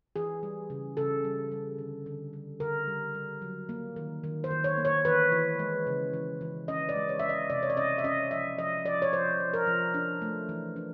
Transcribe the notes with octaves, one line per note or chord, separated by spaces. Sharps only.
E3 G#4
G3
C#3
C#3 A4
G3
G3
D3
D3
G3
D3 A#4
G3
G3
F#3
A#3
D#3
D#3
C5
D#3
C#5
A#3
C#5
E3 B4
E3
G#3
C#3
E3
E3
C#4 D#5
D5
G#3
C#5
G#3 E5
D#5
C3 D5
C#5
D5
C#4 D#5
E5
C#4 D#5
F3 E5
F3 D#5
F3 D5
C#5
F3 C5
F3
A#4
F3
D4
A3
E3
D4